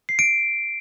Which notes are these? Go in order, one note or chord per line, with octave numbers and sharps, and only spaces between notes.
C7
D7